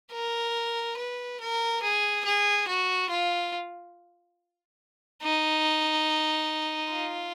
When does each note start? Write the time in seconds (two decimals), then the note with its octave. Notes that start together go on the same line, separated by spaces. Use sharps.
0.13 A#4
0.98 B4
1.41 A#4
1.83 G#4
2.25 G#4
2.68 F#4
3.10 F4
5.23 D#4
6.93 F4